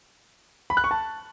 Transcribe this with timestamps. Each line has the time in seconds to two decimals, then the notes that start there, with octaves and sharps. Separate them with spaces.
0.70 B5
0.77 F#6
0.84 C#6
0.91 A5